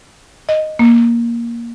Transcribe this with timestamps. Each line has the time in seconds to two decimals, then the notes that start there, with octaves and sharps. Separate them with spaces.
0.49 D#5
0.79 A#3